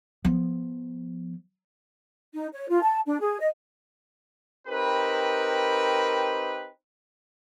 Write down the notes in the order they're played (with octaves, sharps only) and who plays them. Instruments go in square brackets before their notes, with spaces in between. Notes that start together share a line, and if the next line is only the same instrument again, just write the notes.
[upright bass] F3 B3
[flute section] D#4
C#5
F4
A5
D4
G#4
D#5
[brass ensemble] C4 D#4 G4 A#4 B4